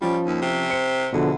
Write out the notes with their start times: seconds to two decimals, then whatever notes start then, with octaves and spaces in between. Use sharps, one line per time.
0.02 F3 G3 C#4 F4
0.26 D#2
0.42 C3
0.70 C5 C#7
1.12 E2 B2 D3 F3